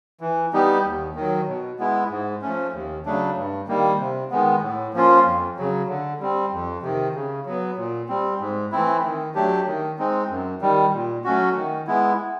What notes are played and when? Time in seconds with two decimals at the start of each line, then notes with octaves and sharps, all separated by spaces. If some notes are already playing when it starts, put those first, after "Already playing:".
0.21 E3
0.53 G3 B3 D#4 G4
0.84 D#2
1.16 D#3 F#3
1.47 B2
1.79 G#3 B3 E4
2.10 G#2
2.42 F3 A3 C#4
2.73 D#2
3.06 C#3 F#3 A3 D4
3.36 G2
3.67 D#3 G3 A#3
3.99 C3
4.31 D#3 G#3 B3
4.62 A2
4.94 F3 A#3 C#4 F4
5.25 F2
5.57 C#3 F#3
5.88 D3
6.20 G3 C4
6.52 F2
6.83 C3 D#3
7.15 C#3
7.46 F#3 B3
7.77 A#2
8.09 G3 C4
8.40 G#2
8.72 E3 A3 C4 E4
9.04 D#3
9.35 F#3 A3 D4 G4
9.67 D#3
9.98 G#3 C4 D#4
10.30 F#2
10.61 D#3 G3
10.93 A#2
11.24 F#3 A3 C#4 F#4
11.56 D#3
11.87 G#3 B3 E4